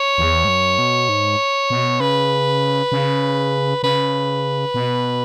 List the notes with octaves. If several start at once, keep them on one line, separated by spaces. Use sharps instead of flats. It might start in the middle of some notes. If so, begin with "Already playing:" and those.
Already playing: C#5
E2
G#2
F#2
B2
G#2
B2
C#3 B4
C#3
C#3 B4
B2